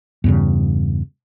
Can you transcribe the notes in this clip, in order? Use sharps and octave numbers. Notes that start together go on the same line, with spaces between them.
E2 G2 C#3